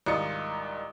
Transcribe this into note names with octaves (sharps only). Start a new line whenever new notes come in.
C2 G#2 D#3 F4 D#6 C#7